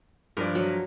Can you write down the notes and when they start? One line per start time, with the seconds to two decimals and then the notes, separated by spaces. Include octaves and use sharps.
0.37 G2 F3 A#4 D5
0.55 F#3